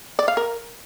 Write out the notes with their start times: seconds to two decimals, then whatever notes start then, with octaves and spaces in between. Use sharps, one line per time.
0.19 D5
0.28 F5
0.37 A#4